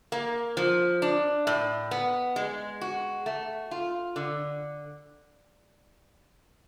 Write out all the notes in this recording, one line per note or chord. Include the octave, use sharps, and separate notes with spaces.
A#3
F3
D4
A2
B3
G#3
F#4
A3
F4
D3